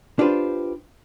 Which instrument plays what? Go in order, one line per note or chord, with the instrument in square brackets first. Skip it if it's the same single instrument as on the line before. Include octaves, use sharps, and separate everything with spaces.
[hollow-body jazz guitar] D4 F4 G4 B4 C5